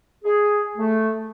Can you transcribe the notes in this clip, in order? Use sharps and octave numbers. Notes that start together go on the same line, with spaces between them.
G#4
A3